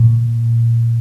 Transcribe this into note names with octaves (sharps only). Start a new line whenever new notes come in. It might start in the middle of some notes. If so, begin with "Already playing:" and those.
Already playing: A#2